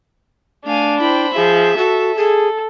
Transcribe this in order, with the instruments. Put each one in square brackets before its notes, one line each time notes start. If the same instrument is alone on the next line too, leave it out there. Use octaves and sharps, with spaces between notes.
[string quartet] A3 F5 G#5 [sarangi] D4
[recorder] E4 [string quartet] C5 G5 B5
[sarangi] F3 [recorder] G#4 [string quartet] E5
[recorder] F#4 [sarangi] A4
[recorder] G#4 [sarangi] A4